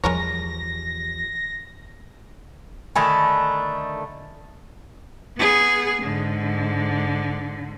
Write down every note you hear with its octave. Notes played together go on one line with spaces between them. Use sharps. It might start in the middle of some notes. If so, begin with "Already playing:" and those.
E2 F3 G3 G#3 A#4 C#5 A#6
D3 D#3 A3 G#5 B5 E6
B3 G#4
G#2 D3